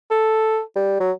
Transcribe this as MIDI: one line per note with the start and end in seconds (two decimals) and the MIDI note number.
0.11 0.60 69
0.76 1.00 55
1.00 1.12 54